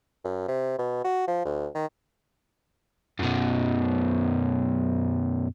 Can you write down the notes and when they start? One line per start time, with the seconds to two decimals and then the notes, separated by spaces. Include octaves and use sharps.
0.25 F#2
0.48 C3
0.79 B2
1.05 F#4
1.28 F3
1.45 D2
1.75 D#3
3.19 F#2 B2